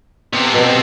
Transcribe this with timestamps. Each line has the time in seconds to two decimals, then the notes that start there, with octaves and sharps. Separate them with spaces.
0.34 C3 B3
0.54 B2 G4